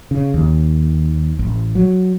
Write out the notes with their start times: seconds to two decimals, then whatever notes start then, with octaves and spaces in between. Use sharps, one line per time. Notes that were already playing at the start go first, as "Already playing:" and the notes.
0.11 C#3
0.34 D#2
1.39 A1
1.75 F#3